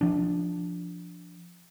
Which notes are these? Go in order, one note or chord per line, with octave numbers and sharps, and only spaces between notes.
F3 D4